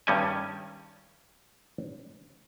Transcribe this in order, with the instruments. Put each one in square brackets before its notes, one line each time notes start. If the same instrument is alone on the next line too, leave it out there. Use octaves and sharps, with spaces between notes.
[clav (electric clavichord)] G2 D#3 G3 C#4 D#5 G#5